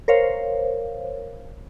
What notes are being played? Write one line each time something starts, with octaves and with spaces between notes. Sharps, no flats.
A#4 C5 C#5 F5